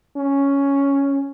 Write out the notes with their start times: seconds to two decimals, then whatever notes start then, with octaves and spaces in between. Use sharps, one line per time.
0.17 C#4